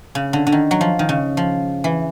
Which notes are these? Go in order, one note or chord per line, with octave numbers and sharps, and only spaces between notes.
C#3
D3
D3
D#3
F#3
F3
D#3
C#3
F3
E3